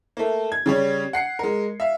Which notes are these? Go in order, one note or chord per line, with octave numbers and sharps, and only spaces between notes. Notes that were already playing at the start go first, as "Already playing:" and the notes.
A3 A#3
G#6
C#3 G3 C#5
F#5 C7 C#7
G#3 A#4
E5 F5